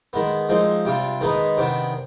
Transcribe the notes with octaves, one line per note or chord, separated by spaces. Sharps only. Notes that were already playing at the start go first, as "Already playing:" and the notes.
D#3 G#3 B3
F3 G#3 C4 D#4
C3 G3 D4 F4
D#3 G#3 B3 D#4 B4
C3 D#3 B3 D4